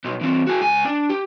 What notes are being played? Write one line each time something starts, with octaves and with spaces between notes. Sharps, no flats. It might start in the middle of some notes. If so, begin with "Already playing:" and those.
B2 D#4
E3 C4
F#4 G#4
C#2 G#5
D4
G4